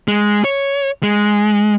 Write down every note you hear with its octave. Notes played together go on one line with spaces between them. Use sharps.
G#3
C#5
G#3